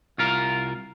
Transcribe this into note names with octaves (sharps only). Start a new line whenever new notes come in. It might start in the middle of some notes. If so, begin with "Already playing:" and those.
C2 F4 A#4